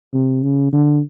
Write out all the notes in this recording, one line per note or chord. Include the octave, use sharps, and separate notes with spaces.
C3
C#3
D3